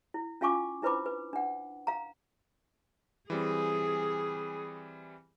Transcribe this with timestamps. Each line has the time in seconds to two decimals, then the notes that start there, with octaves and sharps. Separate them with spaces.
0.14 E4
0.41 C#4 F4 F5 G#5 C#6 D6
0.82 D4 E4 B4 C5 B5 D6
1.06 B4
1.33 D4 F#5
1.87 F5 A#5
3.30 E3 G3 C4 G#4